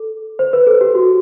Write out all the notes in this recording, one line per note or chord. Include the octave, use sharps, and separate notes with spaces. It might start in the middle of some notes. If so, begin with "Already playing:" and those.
Already playing: A4
C5
B4
A4
G4
F#4